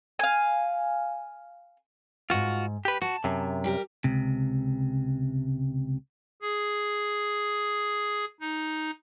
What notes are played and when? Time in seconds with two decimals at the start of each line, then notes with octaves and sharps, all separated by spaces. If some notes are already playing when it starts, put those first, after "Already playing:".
0.19 F5 G#5
2.30 F2 G#2 F4 F#4
2.85 G4 B4
3.02 F#4 A5
3.24 F#2 C3
3.64 G3 G4 A#4
4.04 C#2 C3
6.42 G#4
8.41 D#4